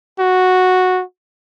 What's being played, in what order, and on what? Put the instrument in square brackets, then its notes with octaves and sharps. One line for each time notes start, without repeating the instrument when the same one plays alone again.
[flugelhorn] F#4